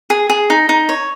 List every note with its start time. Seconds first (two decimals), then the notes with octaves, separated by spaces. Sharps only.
0.10 G#4
0.30 G#4
0.50 D#4
0.69 D#4
0.89 C#5